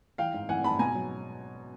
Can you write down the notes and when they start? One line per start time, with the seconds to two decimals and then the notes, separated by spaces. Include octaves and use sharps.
0.18 E3 F5 G5
0.34 G#2
0.49 E3 F#5 G#5
0.64 G#2 A5 B5
0.79 B2 G#5 A#5
0.95 F#3